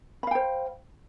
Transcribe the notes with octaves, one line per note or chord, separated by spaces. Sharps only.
C5 F5 G5 B5